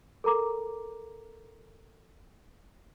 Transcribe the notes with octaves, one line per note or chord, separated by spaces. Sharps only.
A4 A#4 A#5 D6